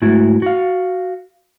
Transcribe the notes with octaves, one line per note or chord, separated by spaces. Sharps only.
G#2 A3 E4 F#4
F#4 F5